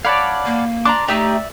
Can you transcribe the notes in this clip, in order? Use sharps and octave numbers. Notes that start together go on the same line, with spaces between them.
C#5 D5 F5 F#5 A5 B5
A#3
D4 A#5 C6 D6
A3 D#4 G4 D5 E5 E6